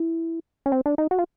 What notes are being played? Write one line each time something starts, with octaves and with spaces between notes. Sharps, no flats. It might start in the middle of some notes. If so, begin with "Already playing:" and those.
Already playing: E4
C#4
C4
D4
D#4
F#4
F4